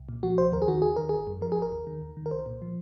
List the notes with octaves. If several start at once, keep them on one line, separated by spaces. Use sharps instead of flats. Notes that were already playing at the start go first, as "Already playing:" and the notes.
Already playing: C2
A#2
F3 F#4
C2 C5
D#2 A#4
G#4
D#3 F#4
D#2 G#4
D#3 A#4
G#1 G#4
F#2
F3 A#4
G#4
G#1
A#4
D#2
D#3
D#2
D#3
A#4
C2 C5
A#2
F3